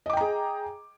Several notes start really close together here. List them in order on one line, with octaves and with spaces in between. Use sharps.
D#5 D6 G5 A#5 G#4